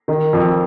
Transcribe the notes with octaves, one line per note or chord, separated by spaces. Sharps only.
D#3
F2